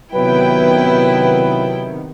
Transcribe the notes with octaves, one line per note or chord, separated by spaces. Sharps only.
C3 D#3 F#3 B3 E4 B4 G5